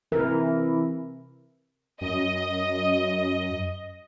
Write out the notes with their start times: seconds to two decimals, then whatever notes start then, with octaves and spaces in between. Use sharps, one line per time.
0.12 C3 E3 A#4
2.01 F#2 D#5